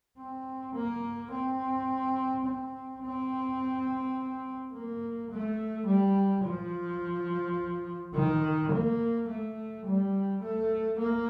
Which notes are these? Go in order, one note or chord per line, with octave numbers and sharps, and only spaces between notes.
C4
A#3
C4
C4
C4
A#3
A3
G3
F3
D#3
A#3
A3
G3
A3
A#3